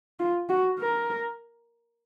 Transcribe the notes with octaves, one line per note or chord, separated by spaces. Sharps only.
F4
F#4
A#4